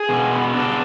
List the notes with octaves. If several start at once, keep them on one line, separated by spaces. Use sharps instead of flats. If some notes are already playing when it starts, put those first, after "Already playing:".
Already playing: G#4 G#5
B2
B3
D4